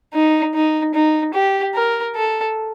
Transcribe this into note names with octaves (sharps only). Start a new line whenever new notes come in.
D#4
D#4
D#4
G4
A#4
A4